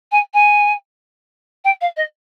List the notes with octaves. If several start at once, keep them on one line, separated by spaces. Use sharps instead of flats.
G#5
G#5
G5
F5
D#5